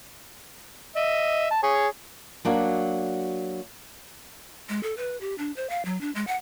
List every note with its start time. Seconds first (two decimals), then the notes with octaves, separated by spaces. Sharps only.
0.96 D#5 E5
1.51 A5
1.63 G#4 C#5
2.45 F#3 A#3 D4 F#4
4.69 G#3
4.83 A4
4.97 B4
5.21 G4
5.38 D4
5.56 C5
5.70 F5
5.85 F#3
6.01 D4
6.15 G#3
6.27 F#5